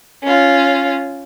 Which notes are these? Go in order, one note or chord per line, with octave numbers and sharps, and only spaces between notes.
C#4 F4